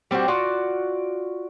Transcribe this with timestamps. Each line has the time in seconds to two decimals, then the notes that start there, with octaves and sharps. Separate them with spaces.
0.11 G3 C4 D4 F#4
0.28 F4 F#4 D5